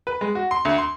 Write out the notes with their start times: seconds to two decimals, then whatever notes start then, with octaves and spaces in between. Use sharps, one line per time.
0.07 B4
0.21 G#3
0.35 F#4
0.51 C6
0.65 D2
0.78 C6